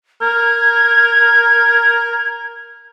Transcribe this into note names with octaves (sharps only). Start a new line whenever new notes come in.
A#4 G#6